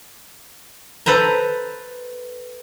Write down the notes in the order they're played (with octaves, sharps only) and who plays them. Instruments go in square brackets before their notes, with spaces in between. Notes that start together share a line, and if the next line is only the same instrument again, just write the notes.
[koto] A4 B4 C5 A#5